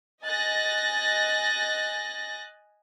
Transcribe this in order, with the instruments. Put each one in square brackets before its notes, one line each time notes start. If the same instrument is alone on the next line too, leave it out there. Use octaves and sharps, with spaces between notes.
[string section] D#5 G#5 F#6 A6 A#6